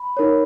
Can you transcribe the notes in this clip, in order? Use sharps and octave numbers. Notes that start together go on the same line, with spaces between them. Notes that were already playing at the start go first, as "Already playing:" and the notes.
Already playing: B5
D#4 A#4 C#5